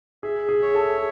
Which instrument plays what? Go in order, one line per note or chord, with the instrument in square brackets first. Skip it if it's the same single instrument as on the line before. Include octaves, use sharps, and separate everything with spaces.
[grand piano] G#4 [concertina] E5
[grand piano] G#4
[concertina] C#5
[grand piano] A4